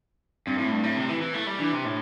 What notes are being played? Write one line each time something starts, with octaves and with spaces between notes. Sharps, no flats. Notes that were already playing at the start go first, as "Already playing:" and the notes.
G2 C4
A2
A3
G2
A2 C4
C3
E3
E3
A3
G3
E3 D4
C3
A2